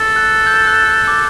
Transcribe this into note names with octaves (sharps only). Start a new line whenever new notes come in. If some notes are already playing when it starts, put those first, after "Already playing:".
Already playing: A4
F#6
G6
F#6
D6